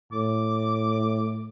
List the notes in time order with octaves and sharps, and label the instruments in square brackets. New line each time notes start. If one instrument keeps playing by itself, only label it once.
[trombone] A2 [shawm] D6